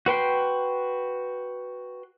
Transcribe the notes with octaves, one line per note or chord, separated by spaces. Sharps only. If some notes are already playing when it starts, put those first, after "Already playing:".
F#4 B4 G5 C6